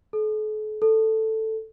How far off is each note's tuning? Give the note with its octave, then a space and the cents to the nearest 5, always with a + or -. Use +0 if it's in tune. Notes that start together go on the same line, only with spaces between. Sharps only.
A4 -45
A4 +5